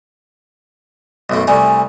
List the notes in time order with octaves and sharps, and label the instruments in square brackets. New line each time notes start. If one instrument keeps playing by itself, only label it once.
[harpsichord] B1 F#2 A3
[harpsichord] C2 G3 A3 [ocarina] G#5